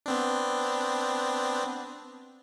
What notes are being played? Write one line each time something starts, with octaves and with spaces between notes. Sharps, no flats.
B3 C4 D4